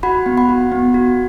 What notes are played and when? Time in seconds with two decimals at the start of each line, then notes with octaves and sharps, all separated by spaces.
0.03 F#4 F#5 B5
0.26 B3
0.37 F#5 B5
0.49 F#4
0.72 B3
0.94 F#4